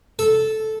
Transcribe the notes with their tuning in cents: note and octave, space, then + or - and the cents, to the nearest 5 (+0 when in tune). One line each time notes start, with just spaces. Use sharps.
A4 -10